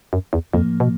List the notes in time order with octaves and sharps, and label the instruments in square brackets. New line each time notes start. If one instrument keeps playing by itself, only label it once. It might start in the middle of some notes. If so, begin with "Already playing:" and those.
[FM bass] F#2
E2
[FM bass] F2 [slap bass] A2 F3 A#3
[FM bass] B2